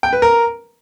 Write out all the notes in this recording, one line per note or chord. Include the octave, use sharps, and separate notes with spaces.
G5
B4
A#4